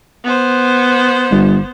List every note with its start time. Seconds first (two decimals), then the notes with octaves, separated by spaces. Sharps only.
0.24 B3 C5
1.31 G1